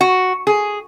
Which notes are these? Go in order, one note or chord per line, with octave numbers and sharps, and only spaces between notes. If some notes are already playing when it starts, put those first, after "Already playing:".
F#4
G#4